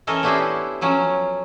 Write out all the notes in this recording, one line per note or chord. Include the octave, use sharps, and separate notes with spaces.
E3 C#4 A4 A#4 D#5
B3 C#4 D4 E4 G4 C5
F3 F#3 C#4